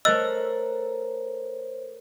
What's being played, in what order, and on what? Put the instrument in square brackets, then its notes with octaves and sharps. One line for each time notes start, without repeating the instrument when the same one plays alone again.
[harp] A3 A#4 F#6 [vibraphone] A4 C5 C#5 [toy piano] D#5 [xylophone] E6